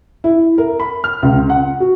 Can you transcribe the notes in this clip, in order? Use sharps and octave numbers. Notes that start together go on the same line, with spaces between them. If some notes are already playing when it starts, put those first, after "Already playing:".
E4
A#4
B5
F6
C#2
F#5
F#4